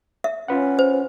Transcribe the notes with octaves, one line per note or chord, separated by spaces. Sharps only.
E5
C#4 F4 B4 F#5
C5